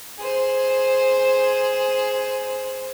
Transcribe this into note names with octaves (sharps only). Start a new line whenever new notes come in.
G#4 C5